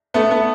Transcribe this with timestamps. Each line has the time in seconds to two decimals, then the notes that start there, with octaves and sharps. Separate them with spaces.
0.14 A3 B3
0.31 A3 B3